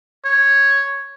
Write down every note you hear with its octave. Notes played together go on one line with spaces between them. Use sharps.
C#5